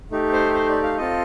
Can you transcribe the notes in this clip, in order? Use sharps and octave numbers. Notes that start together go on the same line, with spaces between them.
A3 D#4 G4
C5
C5
D5
F5
C4 F4 A4 D#5